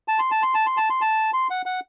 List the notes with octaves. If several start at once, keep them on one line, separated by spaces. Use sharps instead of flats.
A5
C6
A5
C6
A5
C6
A5
C6
A5
C6
F#5
F#5